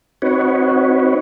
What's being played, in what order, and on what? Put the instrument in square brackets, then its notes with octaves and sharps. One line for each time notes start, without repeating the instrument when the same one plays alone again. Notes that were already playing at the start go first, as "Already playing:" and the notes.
[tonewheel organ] C4 D#4 F#4 B4 C#5